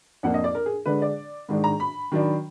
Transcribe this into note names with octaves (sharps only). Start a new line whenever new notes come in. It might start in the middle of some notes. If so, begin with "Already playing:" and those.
F2 F3 A#3 D4 F#5
D#5
D5
A#4
G#4
D3 G#3 D4 B4
D5
G#2 D#3 G#3 D4
A#5
B5
D#3 F#3 D4